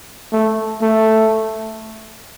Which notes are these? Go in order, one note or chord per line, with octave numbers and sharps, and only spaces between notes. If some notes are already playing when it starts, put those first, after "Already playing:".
A3
A3